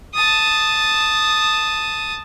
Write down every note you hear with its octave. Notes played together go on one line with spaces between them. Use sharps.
A5 D#6